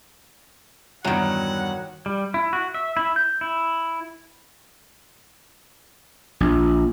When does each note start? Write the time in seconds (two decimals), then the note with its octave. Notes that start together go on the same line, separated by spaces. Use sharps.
1.05 E2 G2 D#3 F#3 F#5 A#5
2.06 G3
2.34 E4
2.53 F#4
2.74 E5
2.97 E4
3.16 G6
3.41 E4
6.40 A#1